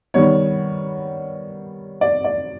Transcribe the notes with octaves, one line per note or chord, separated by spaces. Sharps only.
D#3 G3 B3 C#5
D5
D5